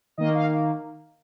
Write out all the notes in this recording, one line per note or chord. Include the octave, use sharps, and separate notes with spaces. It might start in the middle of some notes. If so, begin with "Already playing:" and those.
D#3 A#3 D#5
F5